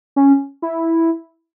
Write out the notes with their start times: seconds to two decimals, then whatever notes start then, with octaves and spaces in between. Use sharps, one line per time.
0.16 C#4
0.62 E4